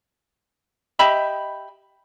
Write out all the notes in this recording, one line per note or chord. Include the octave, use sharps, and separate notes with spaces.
G4 D#5 E5 B5